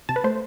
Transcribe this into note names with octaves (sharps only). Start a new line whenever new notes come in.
C3 A5
B4
A3 C5